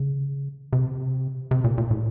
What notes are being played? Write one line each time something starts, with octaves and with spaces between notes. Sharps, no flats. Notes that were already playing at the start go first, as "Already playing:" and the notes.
Already playing: C#3
C3
C3
A#2
A#2
A2